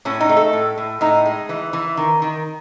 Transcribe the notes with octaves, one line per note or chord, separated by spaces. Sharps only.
A2 C#4
D#4
A3
A4
A2
A2
A2 D#4
G#3
E3
E3
D#3
D#3